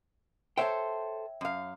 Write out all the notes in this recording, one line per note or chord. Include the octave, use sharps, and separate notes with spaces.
A4 C5 C#5 E5 G5
F#2 F5